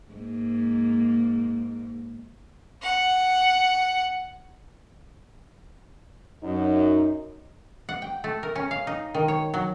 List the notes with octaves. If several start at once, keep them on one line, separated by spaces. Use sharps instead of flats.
G#2 A#3
F#5
F#2 D#4
F#5
G5
A3
A#4
C#4
F5
D#4
D#3
C#5
F#3